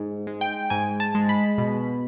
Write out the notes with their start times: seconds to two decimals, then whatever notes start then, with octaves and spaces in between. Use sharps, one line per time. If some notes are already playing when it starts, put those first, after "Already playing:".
Already playing: G#2
0.27 G#3
0.41 G5
0.70 G#2 G#5
1.00 A5
1.15 G#3
1.29 B5
1.58 B2